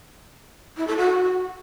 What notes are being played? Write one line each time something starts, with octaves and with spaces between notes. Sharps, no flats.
E4
A4
F#4